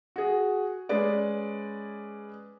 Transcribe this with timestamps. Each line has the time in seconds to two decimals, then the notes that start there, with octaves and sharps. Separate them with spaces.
0.16 F#4 G#4
0.89 G#3 C#4 G#4 B4 D5